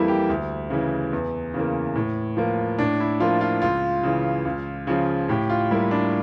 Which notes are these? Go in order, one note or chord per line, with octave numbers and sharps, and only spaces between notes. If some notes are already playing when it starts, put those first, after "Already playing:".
Already playing: F2 E3 G3 A#3 E4 A4
G4
D2
C#3 E3
E2
C#3 E3 A#3
A2
F3 A#3
A2 D4
E4
F3 A#3 F4
F4
C#2 F4
C#3 E3
C#2
C#3 F3
A2 G4
F4
G3 A#3 E4
D4